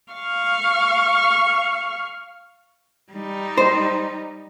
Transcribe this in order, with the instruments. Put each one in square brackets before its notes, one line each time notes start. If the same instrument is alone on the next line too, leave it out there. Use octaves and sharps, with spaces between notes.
[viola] F5 C#6
[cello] G3 D#4
[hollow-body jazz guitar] C5